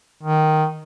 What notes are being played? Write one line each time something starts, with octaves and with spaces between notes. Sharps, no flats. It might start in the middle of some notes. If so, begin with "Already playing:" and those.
D#3